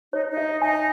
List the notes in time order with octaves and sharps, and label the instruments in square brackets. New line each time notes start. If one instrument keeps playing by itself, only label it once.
[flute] D#4 [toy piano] C#5
[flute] D#4
[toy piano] E5
[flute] D#4 [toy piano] G#5